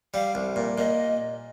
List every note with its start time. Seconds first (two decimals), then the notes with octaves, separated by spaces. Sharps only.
0.14 G3 F5
0.35 C2
0.56 A#2
0.78 A#2 D#5